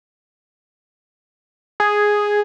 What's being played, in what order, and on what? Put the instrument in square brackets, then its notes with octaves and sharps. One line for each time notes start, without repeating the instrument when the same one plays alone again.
[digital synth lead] G#4